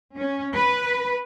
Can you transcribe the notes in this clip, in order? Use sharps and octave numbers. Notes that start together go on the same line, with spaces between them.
C#4
B4